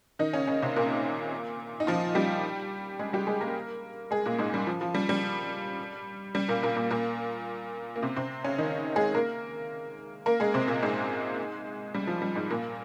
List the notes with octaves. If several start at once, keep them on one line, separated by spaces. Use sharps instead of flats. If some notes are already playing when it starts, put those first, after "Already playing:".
D#3 D#4
C#3 C#4
C#3 C#4
C3 C4
A#2 A#3
D#4
F3 F4
G3 G4
G#3 G#4
G3 G4
G#3 G#4
A#3 A#4
G#3 G#4
A#2 A#3
G#2 G#3
G3
F3
F3
G3
G3
G3
A#2 A#3
A#2 A#3
A#2 A#3
A#2 A#3
A#3
C3 C4
C3 C4
C#3 C#4
D#3 D#4
G#3 G#4
A#3 A#4
A#3 A#4
G#3 G#4
C3 C4
A#2 A#3
G#2 G#3
G3
F3
G3
G#2 G#3
A#2 A#3